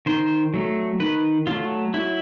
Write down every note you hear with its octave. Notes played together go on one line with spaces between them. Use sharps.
D#3 C5
F#3 A3
D#3 B4
F#3 A3 F4
F#3 E4